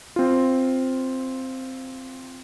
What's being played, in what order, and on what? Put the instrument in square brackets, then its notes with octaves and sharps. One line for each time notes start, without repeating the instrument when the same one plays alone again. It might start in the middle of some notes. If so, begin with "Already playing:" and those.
[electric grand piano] C4 F4